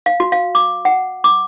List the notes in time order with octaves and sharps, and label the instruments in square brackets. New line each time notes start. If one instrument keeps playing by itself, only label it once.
[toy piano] F5
F#4
F5
D6
F#5
D6